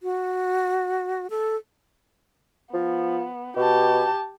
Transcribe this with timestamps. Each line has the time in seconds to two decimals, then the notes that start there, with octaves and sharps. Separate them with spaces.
0.03 F#4
1.30 A4
2.74 F3 B3
3.57 B2 G4 A5